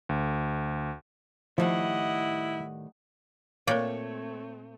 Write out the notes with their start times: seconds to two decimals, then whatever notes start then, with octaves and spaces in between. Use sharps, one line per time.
0.09 D2
1.58 A2 D#3 F3 G3 E4 D#5 F#5
3.67 A#2 A3 A#3 C4 A#4 C#5 D5 G5